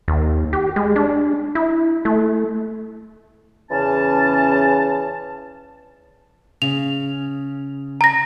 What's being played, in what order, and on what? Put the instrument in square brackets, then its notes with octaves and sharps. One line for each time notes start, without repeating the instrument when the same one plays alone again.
[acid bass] D#2
G4
G#3
D4
E4
A3
[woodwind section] E2 C#3 E3 C#4 A5
[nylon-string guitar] C#3 [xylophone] F7
[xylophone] A#5 A#6